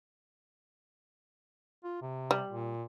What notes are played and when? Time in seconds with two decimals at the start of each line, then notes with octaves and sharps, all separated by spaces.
1.84 F4
2.02 C3
2.31 G3
2.49 A#2